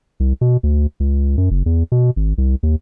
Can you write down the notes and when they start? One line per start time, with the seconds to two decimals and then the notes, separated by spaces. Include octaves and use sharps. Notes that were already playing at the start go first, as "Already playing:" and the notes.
0.20 C2
0.41 B2
0.63 D2
1.00 C#2
1.38 F#2
1.51 F#1
1.66 E2
1.92 B2
2.16 G#1
2.38 C2
2.63 D#2